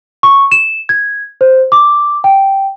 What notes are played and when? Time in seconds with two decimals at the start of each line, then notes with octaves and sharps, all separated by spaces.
0.23 C#6
0.52 E7
0.89 G#6
1.41 C5
1.72 D6
2.24 G5